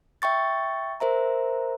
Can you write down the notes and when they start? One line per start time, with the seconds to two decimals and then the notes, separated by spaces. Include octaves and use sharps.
0.22 E5 G5 C#6 A6
1.00 A#4 C5 E5 A#5